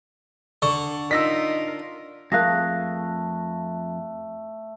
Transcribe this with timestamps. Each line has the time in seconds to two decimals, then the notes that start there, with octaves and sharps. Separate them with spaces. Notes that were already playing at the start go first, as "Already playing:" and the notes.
0.62 D3 C#6
1.11 D#4 F4 A#4 E6 A#6 B6
2.32 F2 A3 G#4 A#4 F5 F#6 A#6